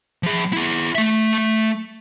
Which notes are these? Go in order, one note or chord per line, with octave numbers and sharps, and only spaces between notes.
F3 G#4
E4 G#4
A3 E5